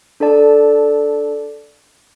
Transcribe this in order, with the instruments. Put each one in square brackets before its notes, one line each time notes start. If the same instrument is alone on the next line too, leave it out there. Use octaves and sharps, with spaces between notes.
[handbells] D4 A4 D5 A5